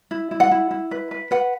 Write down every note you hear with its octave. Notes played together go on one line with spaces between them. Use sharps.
E4
E4
F#5
E4
E4
B4
B4
B4 F#5